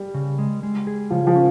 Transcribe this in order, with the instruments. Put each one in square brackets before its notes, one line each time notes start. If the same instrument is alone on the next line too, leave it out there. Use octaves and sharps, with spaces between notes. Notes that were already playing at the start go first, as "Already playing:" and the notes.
Already playing: [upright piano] G3
[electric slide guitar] C#3
G#3
G#3
G#4
[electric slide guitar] C#3 [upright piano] F3
[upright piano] F3
[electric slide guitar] C#4